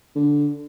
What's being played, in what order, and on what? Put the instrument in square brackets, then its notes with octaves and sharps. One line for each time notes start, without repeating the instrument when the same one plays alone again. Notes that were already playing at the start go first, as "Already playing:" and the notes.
[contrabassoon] D3